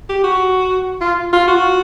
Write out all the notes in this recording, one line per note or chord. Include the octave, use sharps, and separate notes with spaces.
G4
F#4
F4
F4
F#4